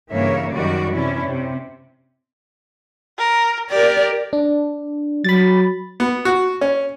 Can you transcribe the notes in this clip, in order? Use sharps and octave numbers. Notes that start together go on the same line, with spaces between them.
G2 C#3 E3 A#3 C#5 E5
F#2 D#3 G3 F#4 D5
C3 E3 C#4 D4 E4
C3
A#4
G4 A#4 D5
D4
F#3 B5 A6
B3
F#4
C#4